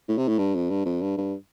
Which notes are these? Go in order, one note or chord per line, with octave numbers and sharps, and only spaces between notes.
A2
C3
A2
G2
F2
G2
F2
G2
G2